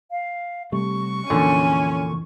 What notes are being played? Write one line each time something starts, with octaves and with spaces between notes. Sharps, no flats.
F5
C3 G3 A3 C#6
F2 A#2 D3 E3 C#4 D4 G#5